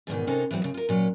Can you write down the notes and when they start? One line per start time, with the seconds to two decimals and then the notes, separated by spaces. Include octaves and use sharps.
0.07 E2 G#2 B2 D#3
0.27 C3 C#4 D#4 A4 A#4 C5
0.51 E3 F#3 B3 C4 F#4
0.62 D#2 C#3
0.74 F4 A#4
0.89 A#2 F#3 C#4